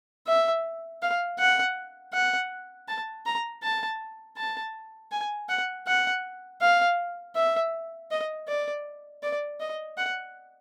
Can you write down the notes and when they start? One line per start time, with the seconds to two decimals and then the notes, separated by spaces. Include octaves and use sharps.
0.27 E5
1.02 F5
1.39 F#5
2.13 F#5
2.88 A5
3.26 A#5
3.63 A5
4.37 A5
5.12 G#5
5.49 F#5
5.87 F#5
6.61 F5
7.36 E5
8.11 D#5
8.48 D5
9.23 D5
9.61 D#5
9.97 F#5